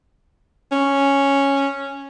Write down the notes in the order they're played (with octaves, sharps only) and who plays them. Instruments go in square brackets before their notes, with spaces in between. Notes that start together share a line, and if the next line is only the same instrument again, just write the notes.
[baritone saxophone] C#4